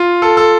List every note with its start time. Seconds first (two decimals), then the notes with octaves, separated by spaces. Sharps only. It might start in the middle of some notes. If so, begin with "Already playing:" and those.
Already playing: F4
0.22 A4
0.37 A4